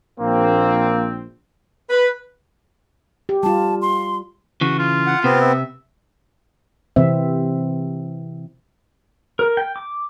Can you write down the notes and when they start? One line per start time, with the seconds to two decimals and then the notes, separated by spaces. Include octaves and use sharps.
0.20 A#1 A#3 C4
1.90 B4
3.29 G4
3.43 G3 F4 A5
3.82 C6
4.61 C#3 E3 F#4
4.79 F4
5.07 F#5
5.24 C3 B3 C4
5.41 E5
6.96 C3 E3 C4 E5
9.39 A#4
9.57 G5
9.76 D6